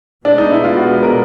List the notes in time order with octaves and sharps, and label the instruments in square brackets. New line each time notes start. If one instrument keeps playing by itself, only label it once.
[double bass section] B2 G#3 B3 [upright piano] D4
[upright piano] D#4
E4
F4
F#4
A#4